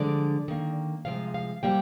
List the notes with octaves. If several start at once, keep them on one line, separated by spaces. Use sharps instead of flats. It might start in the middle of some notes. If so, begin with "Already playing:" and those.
Already playing: D3 F3 G#3 D5
D#3 A#3
C3 F3 G#3 F5
F5
C3 G3 A#3 G5